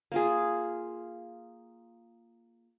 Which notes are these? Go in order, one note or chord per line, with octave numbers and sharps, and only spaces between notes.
A#3 F4 G#4